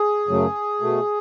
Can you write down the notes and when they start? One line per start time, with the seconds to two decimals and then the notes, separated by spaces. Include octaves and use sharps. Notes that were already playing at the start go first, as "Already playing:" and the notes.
Already playing: G#4
0.28 F#2 C#3 F#3 A3
0.81 B2 A3